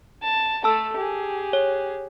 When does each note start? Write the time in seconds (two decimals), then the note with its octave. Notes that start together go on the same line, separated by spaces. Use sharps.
0.22 A5
0.64 A3 A4 A5 E6
0.97 G4 G#4
1.53 C#5